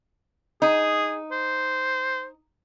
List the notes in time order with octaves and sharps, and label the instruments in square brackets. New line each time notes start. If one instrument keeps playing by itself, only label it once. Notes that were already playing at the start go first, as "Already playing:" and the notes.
[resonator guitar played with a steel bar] D#4 [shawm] G#4
[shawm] C5